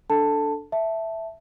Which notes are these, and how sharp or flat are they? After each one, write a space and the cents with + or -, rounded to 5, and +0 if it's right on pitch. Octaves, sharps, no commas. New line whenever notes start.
D4 +0 A4 +0 A5 +10
E5 +0 A5 +0